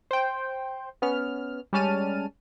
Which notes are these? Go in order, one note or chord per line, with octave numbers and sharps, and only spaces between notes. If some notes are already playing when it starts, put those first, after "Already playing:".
C5 G5
B3 C#4 F6
G3 G#3 C#4 A5 F6 D#7